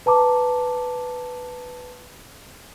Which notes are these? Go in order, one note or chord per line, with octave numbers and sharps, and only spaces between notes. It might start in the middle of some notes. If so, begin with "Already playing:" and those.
B4 A5 A#5 D6